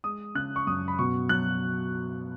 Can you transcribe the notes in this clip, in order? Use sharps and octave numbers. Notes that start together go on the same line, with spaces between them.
G#3 D#6
C#3 F#6
C#6
F#2 D#6
B5
B2 C#6
F#3 F#6